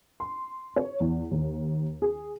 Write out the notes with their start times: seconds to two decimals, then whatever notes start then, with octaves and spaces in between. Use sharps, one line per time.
0.20 C6
0.76 C#5
1.00 E2
1.31 D#2
2.02 G#4